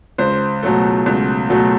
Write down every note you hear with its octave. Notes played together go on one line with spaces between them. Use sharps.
C#2 C5
B2 F#3 A3
C#2
B2 F#3 A3